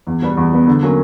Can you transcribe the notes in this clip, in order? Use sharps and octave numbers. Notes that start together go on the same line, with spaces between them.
E2
B2 G3 B3
E2
B2 G3 B3
D3
F#3 A#3 C#4